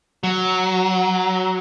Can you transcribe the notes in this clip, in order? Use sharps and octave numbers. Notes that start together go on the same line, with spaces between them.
F#3